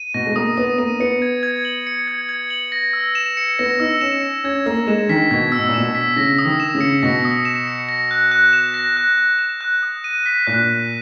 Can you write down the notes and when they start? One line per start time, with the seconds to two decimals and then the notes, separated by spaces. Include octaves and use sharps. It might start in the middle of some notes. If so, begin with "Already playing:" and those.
Already playing: D#7
0.14 B2 A#6
0.26 G#3
0.36 A#3 D#6
0.57 B3 D#6
0.78 A#3 D#7
1.00 B3 C#7
1.22 G#6
1.43 G#6
1.65 F#7
1.87 C#7
2.08 G#6
2.29 G#6
2.50 F#7
2.72 A#6
2.93 E6
3.15 E7
3.37 C#7
3.59 B3 A#6
3.80 D#4 E6
4.01 C#4 E7
4.23 C#7
4.44 C#4 G#6
4.66 A#3 E6
4.87 G#3 E7
5.09 D#3 B6
5.31 B2 G#6
5.52 E6
5.59 B2
5.69 A#2
5.74 B2 E7
5.88 B2
5.95 B6
6.16 C#3 A#6
6.38 D#6
6.45 D#3
6.60 E7
6.74 C#3
6.81 C#7
7.03 B2 A#6
7.25 D#6
7.45 E7
7.68 C#7
7.89 A#6
8.11 F#6
8.31 F#6
8.53 E7
8.74 A#6
8.97 F#6
9.18 F#6
9.39 E7
9.61 F#6
9.83 D#6
10.04 D#7
10.26 B6
10.47 A#2 F#6